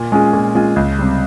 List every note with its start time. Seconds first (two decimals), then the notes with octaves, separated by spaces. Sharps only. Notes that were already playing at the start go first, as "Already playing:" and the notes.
Already playing: A#2
0.12 G#3 C#4 F4 G#4
0.33 A#2
0.55 G#3 C#4 F4 G#4
0.76 C#2
0.99 C3 G3